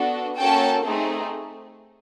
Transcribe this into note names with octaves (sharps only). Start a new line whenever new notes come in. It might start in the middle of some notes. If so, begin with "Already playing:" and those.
Already playing: B3 D4 F#4 A4
A#3 C#4 F#4 A4 G5 A5
A3 C4 D#4 G#4